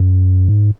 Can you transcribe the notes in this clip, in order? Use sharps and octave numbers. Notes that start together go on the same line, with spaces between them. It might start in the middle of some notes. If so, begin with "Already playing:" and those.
Already playing: F#2
G#2